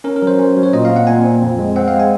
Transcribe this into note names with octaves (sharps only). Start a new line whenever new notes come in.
C#4 A#4
A#4
F#3 C5
C#4
F#3
C#5
A#2 D#5
C4 F5
F#5
A#2 G#5
C4
F2
G#3
C4 F#5
F5
G#3
G#5